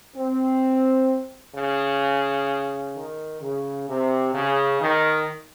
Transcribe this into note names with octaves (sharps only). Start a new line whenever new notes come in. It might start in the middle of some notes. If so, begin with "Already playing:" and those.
C4
C#3
D#3
C#3
C3
C#3
D#3